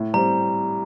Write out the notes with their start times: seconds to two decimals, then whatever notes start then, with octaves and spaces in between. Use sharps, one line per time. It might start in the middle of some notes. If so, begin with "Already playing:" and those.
Already playing: A2
0.14 G3 C4 A#5